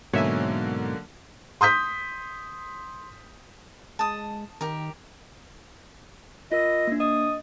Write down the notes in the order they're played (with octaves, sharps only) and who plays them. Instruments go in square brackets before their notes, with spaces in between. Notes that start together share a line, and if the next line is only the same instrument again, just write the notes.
[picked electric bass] G#2 B2 [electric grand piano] D3 F#3 A#3 [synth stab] C#5 E5 G#5
[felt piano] C6 D#6 G6 B6
[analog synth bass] G#3 [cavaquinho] A5 D#6
[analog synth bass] D#3 [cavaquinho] G4 A#4
[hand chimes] F4 A#4 E6 [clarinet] D#5
[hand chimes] A#3 D4
[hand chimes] D#5 [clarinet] D#6